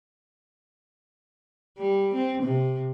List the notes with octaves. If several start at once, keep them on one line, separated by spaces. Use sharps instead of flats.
G3
C4
C3